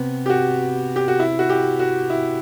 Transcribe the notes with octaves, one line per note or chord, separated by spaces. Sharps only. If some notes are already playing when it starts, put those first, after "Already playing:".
Already playing: C3 B3
G4
F#4
G4
F#4
E4
F#4
G4
F#4
E4